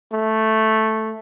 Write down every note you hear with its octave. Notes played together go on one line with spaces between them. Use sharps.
A3